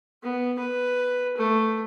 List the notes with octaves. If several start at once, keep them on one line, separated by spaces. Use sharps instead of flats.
B3
B4
A3